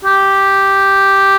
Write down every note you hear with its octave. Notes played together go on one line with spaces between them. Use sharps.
G4